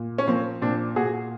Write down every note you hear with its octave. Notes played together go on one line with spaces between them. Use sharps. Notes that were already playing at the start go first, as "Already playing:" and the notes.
Already playing: A#2
C#4
F3 A#3 C4
A#2 C4 D4
A#2 F#4 G#4